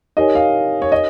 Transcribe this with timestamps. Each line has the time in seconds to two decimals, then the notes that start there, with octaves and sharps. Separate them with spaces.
0.17 D#4 G4 A#4 C#5 D#5 G#5
0.35 F5
0.82 C#5
0.92 D#5